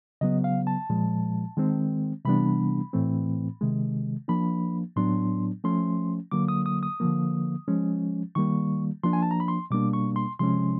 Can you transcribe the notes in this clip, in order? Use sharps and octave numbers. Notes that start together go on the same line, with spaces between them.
C#3 F#3 B3 D#5
F5
A5
A#2 F3 G#3
D#3 G#3 C4
C3 E3 G3 B3 D4 B5
A2 E3 A3 C4
C3 D#3 G#3
F3 A#3 D4 B5
A2 F#3 B3 D4 C6
F3 A3 C#4 C6
D3 F#3 A#3 D6
D#6
D#6
D#6
D3 F3 A#3
F3 G#3 C#4
D#3 G3 A#3 C#6
F3 A#3 D4 C6
G#5
A5
A#5
B5
C6
B2 G3 A#3 D4 D6
C#6
C6
C3 F3 G#3 C#4 C6